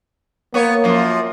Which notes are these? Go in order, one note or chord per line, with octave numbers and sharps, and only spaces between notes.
A#3 B3 C#5
F#2 F3